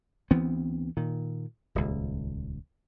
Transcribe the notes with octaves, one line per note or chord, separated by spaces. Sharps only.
D2 E3 B3 C4
A#2 D#3
D#1 C#2